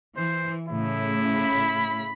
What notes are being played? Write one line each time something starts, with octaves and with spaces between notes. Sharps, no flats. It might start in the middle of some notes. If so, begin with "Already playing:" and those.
E3 C5
A2 C#3 E4
B5